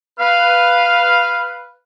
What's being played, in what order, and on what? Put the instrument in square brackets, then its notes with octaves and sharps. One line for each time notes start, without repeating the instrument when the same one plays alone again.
[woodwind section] B4 F5